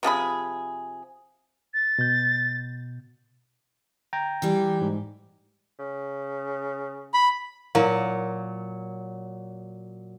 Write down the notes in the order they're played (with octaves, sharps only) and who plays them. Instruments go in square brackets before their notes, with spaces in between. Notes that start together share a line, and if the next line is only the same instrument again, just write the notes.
[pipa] C3 F3 G#4 B5
[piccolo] A6
[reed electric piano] B2 G6
[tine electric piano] G5 A#5
[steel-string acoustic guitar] E3 G3 G4
[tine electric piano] G#2
[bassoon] C#3
[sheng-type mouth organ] B5
[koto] A#2 F#3 [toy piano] E4 A#4 F5